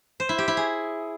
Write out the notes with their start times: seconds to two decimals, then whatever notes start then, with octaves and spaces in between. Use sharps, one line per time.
0.20 C5
0.29 E4
0.38 G4
0.48 E4
0.57 G#4